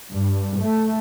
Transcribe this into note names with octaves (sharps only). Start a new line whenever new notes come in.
G2
A3